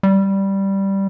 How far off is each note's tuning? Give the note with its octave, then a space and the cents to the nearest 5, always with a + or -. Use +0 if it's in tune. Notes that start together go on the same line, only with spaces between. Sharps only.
G3 -5